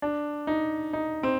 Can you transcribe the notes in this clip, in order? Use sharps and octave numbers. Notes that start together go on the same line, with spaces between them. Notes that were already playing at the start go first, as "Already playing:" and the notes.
D4
D#4
D#4
C4